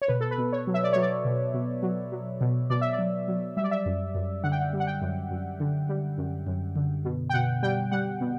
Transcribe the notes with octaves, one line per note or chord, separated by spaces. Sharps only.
C#5
B2 B4
A4
B4
B2
C#5
F#3
E5
D5
F#3 C#5
D5
B2
B2
F#3
F#3
B2
B2 D5
E5
D5
F#3
F#3
G3 E5
D5
E5
F#2
F#2
D3 F#5
G5
F#5
G3
F#5
G5
F#2
F#2
D3
G3
F#2
F#2
D3
B2
G5
B2 F#5
G3 G5
G3 F#5
B2